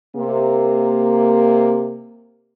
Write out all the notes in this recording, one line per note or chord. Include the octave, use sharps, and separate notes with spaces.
C3 A#3